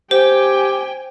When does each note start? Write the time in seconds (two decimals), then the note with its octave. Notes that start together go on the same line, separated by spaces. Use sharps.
0.11 G4 C5 G5 G#5